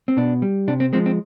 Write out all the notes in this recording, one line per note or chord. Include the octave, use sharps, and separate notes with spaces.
C4
B2 D4
G3
C3 D4
C4
F3 G#3 C4
C4